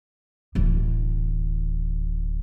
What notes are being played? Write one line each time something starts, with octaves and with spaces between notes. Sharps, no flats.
D1 E3